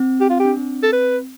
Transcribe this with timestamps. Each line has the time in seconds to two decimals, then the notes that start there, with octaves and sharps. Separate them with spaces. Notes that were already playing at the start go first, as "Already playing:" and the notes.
Already playing: C4
0.21 G4
0.30 F4
0.39 G4
0.45 D4
0.57 C4
0.83 A4
0.92 B4